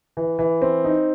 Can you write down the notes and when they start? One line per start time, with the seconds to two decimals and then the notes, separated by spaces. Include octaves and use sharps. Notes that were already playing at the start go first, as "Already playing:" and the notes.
0.17 E3
0.39 E3
0.62 C4
0.84 D#4